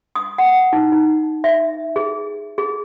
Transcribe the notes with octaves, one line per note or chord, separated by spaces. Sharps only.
D#6
F#5
D#4
D#4
E5
G#4
G#4